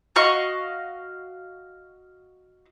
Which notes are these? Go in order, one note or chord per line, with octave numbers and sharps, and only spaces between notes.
F#4 D#5 F5 C#6